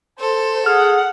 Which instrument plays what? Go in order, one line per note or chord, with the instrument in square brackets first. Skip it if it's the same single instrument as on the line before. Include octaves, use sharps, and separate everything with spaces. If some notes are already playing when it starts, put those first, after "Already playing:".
[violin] A4 [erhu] C5
[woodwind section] G#4 [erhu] F#5 [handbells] F6